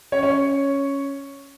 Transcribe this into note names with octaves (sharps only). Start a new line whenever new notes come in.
C#4 C#5
C#4 C#5